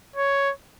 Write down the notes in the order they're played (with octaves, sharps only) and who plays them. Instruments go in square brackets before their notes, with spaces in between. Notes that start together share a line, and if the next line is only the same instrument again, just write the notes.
[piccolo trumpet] C#5